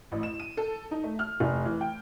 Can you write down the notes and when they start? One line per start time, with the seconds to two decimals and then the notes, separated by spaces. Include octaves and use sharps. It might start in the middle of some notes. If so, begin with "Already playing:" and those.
0.12 A1
0.23 E7
0.40 D#7
0.57 A4
0.91 D#4
1.04 A3
1.19 F6
1.40 F1
1.65 E3
1.81 G5